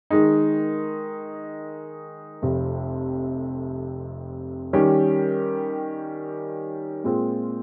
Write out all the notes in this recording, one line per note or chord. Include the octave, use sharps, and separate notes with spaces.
D#3 G#3 D#4
F1 F2 C3
D#3 G3 C#4 G4
A#2 G#3 C4 F4